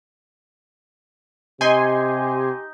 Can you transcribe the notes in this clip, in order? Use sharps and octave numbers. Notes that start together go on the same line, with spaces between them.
C3 D#4 G4 G#5 C6